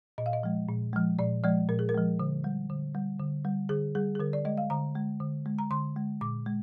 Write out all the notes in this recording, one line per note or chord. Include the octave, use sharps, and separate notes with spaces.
A#2 D#5
F5
D#5
F3 G#3
A#2
F3 G#3
A#2 D5
F3 G#3 D5
A#2 A#4
G#4
A#4
F3 G#3
D3
G3
D3
G3
D3
G3
D3 G#4
G3 G#4
G#4
D3 A#4
D5
G#3 D#5
F5
D3 A#5
G#3
D3
G#3
A#5
D3 C6
G#3
A#2 D6
G#3